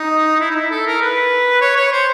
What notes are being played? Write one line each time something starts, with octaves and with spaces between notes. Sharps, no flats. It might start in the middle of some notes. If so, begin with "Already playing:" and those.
Already playing: D#4
E4
D#4
E4
A4
A#4
B4
C#5
C#5
C5